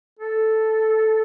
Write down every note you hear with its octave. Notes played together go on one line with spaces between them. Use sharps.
A4